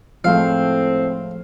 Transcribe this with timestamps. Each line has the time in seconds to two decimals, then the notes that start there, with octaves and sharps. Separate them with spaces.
0.24 A2 F3 G#3 A3 C4 F5